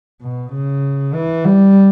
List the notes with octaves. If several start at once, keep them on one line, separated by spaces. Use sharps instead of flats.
B2
C#3
E3
G3